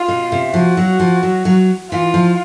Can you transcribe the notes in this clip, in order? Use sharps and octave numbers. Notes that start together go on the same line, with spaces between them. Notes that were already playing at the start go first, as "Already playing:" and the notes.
Already playing: F4
B2
C3
F3 F#4
F#3
F3
F#3
F#3
E3 F4
F3